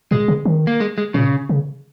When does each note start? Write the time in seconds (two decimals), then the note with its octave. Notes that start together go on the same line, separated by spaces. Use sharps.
0.11 A#2 G#3
0.28 C#3
0.45 D#3
0.67 A#3
0.80 G#3
0.98 G#3
1.14 A#2 C#3
1.49 C#3